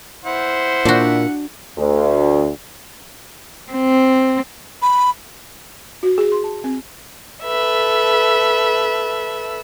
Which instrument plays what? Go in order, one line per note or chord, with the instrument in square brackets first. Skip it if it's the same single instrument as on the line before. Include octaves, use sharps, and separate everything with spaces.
[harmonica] E4 F#5 [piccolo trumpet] C5
[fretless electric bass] A#2 [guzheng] D4 F#4
[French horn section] D2
[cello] C4
[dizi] B5
[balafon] F#4
G#4
C6
A5
C4
[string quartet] A4 B4 E5